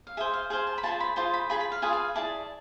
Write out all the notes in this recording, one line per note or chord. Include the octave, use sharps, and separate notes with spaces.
F5
G#4 C5 E5
F5
G#4 C5 F5
A5
B5
F4 G#4 C5 A5
B5
F4 G#4 C5 C6
B5
F4 G#4 B4 B5
B5
F5
F4 G#4 B4 G#5
F5
E4 G#4 D5 A5